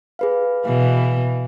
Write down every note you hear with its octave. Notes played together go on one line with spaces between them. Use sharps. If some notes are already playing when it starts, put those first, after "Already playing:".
G#4 B4 F5
B2 E3 F5